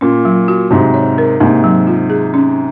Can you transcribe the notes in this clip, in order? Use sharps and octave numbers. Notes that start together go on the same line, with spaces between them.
A#2 C#4
F#3
F#4
G#2 C3 F#4
C#5
A#4
G#2 C3 A#3
F#3
F4
G#4
C#4